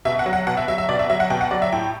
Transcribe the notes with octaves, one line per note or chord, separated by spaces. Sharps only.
B2 E5
F#5
F#3
F#5
B2 F#5
E5
F#3 E5
E5
B2 D5
E5
F#3 E5
F#5
B2 G5
F#5
F#3 D5
E5
A2 G5